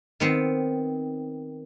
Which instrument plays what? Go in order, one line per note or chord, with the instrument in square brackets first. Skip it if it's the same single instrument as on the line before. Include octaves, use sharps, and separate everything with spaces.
[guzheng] D#3 B3 C4